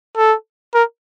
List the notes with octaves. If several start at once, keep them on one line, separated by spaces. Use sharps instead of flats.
A4
A#4